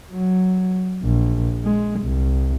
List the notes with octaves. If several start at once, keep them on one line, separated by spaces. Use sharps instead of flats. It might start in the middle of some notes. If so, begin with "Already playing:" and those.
F#3
A#1
G#3
C2